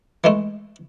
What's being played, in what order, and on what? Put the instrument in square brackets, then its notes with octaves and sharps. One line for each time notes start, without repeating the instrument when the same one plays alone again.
[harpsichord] E3 G#3 A3